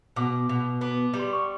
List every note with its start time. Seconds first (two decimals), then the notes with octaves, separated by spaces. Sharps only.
0.16 B2 D6
0.49 B2
0.81 B3 D6
1.14 G3
1.19 C6
1.33 C#6